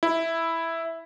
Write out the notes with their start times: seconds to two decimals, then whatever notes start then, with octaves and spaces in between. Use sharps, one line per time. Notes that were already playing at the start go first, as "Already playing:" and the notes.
0.03 E4